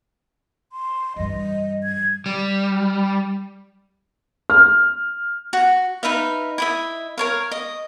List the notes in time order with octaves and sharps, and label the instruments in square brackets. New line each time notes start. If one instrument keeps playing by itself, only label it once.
[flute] C6
[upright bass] G2 E3 [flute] D#5
[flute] G#6
[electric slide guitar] G3
[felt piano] F6
[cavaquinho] F#4
D#4 B4 E5 F5
E4 D#5 E5
A#4 C#5 F5
D#5